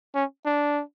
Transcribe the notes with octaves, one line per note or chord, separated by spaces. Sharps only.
C#4
D4